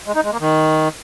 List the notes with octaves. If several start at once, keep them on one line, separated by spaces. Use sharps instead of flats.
G#3
D#4
G#3
A#3
D#3